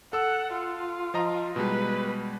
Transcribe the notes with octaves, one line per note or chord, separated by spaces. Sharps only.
A4 F#5 E6
F4
F3 D#5 A#5
B2 G3 G#3 B4